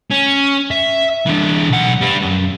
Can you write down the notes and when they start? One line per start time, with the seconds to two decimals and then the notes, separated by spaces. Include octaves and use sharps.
0.11 C#4
0.71 E5
1.26 E3 D4
1.70 B1 F#5
2.01 G3 B4
2.22 F#2